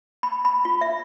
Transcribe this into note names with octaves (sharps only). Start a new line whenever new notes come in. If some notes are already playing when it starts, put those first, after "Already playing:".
B5
B5
F4
E5